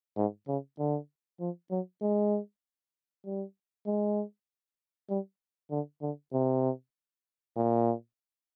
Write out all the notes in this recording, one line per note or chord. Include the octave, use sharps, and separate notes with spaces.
G#2
C#3
D3
F3
F#3
G#3
G3
G#3
G3
D3
D3
C3
A#2